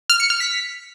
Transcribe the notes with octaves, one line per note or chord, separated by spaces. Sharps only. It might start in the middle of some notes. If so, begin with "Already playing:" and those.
F6
C#7
F6
B6